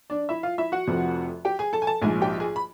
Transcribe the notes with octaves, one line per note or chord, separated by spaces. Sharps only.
D4 D5
E4 E5
F4 F5
E4 E5
F#4 F#5
F1 F2 C3 F3
G4 G5
G#4 G#5
A4 A5
G#5
A4 A5
A#1 G#2 F3 G#4 G#5
G4 G5
G#4 G#5
B5